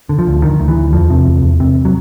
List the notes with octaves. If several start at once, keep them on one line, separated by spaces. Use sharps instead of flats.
D3
F3
D2
D3 D#3
D2
E3
D2
E2 F3
C3
E2
E2
C3
F#3